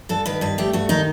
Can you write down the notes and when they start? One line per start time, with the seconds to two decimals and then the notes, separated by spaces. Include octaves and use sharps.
0.09 G2 A4
0.26 D#3 B4
0.41 G2 B4
0.58 A3 G4
0.73 G2 F#4
0.89 D#3 D#4